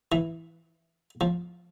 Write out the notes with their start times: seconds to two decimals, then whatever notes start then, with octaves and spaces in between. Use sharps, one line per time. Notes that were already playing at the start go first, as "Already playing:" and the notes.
0.12 E3
1.21 F3